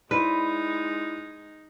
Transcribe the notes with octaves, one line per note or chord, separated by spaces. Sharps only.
G#3 D#4 E4 B4 C5 D5